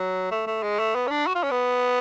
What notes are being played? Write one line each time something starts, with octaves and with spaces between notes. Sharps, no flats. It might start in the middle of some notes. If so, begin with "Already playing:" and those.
Already playing: F#3
A3
A3
G#3
A3
B3
C#4
D4
F#4
F4
C#4
B3